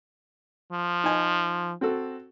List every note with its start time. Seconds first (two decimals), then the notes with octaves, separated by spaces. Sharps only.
0.72 F3
1.04 D#4 G#5
1.81 C4 F#4 A4